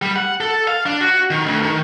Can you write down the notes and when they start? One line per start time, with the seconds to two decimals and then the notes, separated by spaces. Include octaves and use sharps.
0.02 G3
0.16 F#5
0.41 A4
0.68 F5
0.86 D4
1.01 F#4
1.30 D#3
1.46 D2
1.63 D#3